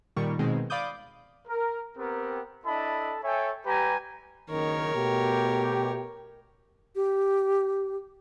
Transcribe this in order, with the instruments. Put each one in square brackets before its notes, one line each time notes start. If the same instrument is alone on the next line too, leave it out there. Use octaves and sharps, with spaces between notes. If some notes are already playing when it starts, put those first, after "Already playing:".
[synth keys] A#2 D#3 G3 C#6
B2 D#3 G#3 C4
D5 F5 B5 D6 D#6 G6
[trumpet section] A#4
B3 C4 G4 A#4
D4 E4 A4 D#5 A5 B5
A4 C#5 E5 G5 G#5
G3 G4 B4 G#5 A#5
[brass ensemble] F#1 D#3 [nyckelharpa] A#4 C#5
[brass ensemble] B2 A3 G4
[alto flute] G4